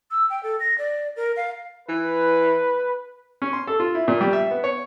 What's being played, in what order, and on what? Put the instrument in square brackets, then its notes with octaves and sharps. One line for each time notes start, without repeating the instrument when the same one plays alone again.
[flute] E6
G5
A4
A#6
D5
A#4
F5
[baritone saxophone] E3 [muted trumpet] B4
[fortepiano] C#4
C6
A4
F4
E4
A#2
G3
E5
B3
C#5